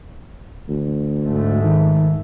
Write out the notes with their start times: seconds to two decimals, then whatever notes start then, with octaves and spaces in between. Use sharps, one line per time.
0.69 D2
1.22 G#2 A3
1.63 D#3